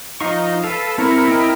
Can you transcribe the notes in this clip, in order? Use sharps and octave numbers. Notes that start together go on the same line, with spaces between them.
F3 D#4 F5 C#6
A4 B4 F5
C4 E4 A#4 C#6
C4 D#5 G5